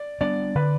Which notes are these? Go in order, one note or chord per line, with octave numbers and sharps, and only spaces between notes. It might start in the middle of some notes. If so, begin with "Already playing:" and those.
Already playing: D5
G3 B3 D4 D5
D3 B4